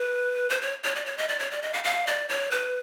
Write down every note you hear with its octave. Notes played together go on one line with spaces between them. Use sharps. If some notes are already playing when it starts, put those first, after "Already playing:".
Already playing: B4
C5
C#5
C#5
D5
C#5
D#5
D5
C#5
D5
D#5
F5
F5
D5
C#5
B4